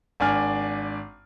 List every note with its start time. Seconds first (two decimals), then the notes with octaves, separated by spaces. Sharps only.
0.20 G#1 D4 G#5 F6